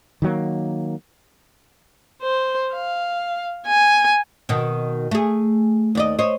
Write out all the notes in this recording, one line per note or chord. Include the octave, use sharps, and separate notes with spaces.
D#3 F#3 A#3
C5
F5
G#5
B2 D#3
A3 G#4
D#2 D5 D#5
C5 C#5 D#5